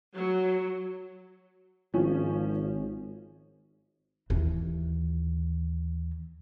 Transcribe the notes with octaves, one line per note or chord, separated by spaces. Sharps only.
F#3
G#1 F3 C#4
D#2 E3